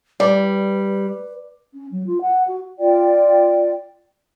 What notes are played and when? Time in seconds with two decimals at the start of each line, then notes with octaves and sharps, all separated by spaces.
0.20 G3 B4 D5
1.73 C#4
1.91 F#3
2.06 F4
2.21 F#5
2.47 F#4
2.79 F4 D5 G5